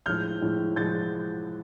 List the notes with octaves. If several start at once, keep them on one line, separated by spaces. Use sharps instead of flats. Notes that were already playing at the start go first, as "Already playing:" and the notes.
A2 F3 G#3 F6 G6
A2 F3 G#3
A2 F3 G#3 G6 A6